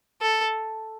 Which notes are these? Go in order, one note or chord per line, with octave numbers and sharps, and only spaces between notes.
A4